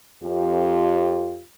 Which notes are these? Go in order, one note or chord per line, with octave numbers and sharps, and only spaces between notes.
F2 F4 G4